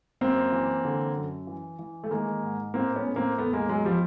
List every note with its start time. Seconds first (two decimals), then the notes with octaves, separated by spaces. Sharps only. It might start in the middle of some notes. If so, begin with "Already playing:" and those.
0.21 F#2 A#3 C4
0.52 E3
0.85 D3
1.16 F#2
1.47 E3
1.79 E3
2.04 A3
2.10 D#3 G#3 A#3
2.43 G#2
2.74 A2 A#3 C4
2.96 B3 C#4
3.06 A2
3.16 A#3 C4
3.38 E2 A3 B3
3.53 G#3 A#3
3.69 E2 F#3 G#3
3.85 F3 G3